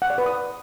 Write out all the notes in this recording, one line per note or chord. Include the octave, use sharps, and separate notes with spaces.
F#5
D5
B4
D#6